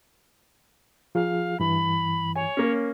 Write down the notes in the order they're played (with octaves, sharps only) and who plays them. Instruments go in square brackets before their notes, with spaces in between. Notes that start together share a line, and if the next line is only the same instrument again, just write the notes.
[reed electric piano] F3 F4 G#4 [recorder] F5
[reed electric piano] G2 E3 [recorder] B5
[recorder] C#5 [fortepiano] G#5
[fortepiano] A#3 C#4